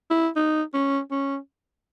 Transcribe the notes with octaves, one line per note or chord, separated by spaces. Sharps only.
E4
D#4
C#4
C#4